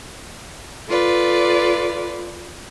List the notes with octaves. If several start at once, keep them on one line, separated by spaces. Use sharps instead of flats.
F4 A4 B4 D5